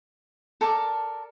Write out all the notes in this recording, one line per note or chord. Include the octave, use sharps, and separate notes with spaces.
A4 A#4 D5 A5